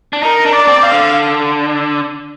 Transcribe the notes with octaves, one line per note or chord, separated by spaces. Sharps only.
D4
D#4 A#4
D4
D5
C4
F5
D3